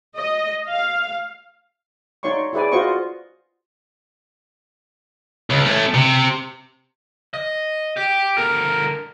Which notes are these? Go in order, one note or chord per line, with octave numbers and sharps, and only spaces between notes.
D#5
F5
D#4 C#5 D5 C6 C#6
E4 G#4 B4 D5 G#5
F4 F#4 C5 D#5 C#6
C#2
A3 C#4
C3
D#5
G4
D3 A#4